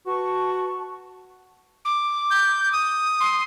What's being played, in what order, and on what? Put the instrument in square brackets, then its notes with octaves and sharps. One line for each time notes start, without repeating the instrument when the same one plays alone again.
[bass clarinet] F#4 [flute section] B4 A5 C#6
[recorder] D6
[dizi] G6
D#6
[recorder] C6